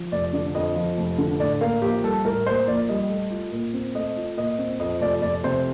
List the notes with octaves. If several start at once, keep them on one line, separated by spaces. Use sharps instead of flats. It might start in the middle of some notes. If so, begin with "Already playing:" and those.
Already playing: F3
F1 D5
D3 D5
F2 D#5
F3
F1
D3
A2 D5
A#3 F5
A#1 G4
G3 A4
A2 A#4
A#3 C5
A#1 D5
G3 D#5
A3
F4
A#2
C4
A3 D#5
F4
A#2 D#5
C4
F2 D#5
F1 D5
F1 D5
C3 C5